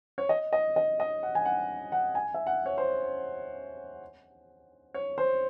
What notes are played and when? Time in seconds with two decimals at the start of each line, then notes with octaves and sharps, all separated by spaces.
0.18 C#5
0.29 D#5
0.53 D#5
0.76 D#5
1.00 D#5
1.23 F#5
1.35 G#5
1.45 F#5
1.92 F#5
2.15 G#5
2.34 E5
2.47 F#5
2.66 C#5
2.78 C5
4.94 C#5
5.18 C5